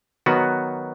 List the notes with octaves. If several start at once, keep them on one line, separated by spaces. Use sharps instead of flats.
D#3 F#3 B3 F#4